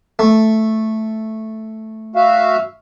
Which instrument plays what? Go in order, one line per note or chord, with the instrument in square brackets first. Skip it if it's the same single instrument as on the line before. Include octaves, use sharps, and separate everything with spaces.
[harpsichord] A3
[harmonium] F#4 E5 F5